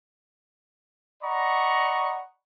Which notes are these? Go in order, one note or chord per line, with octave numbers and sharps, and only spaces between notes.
D5 D#5 F#5 A#5 B5 C#6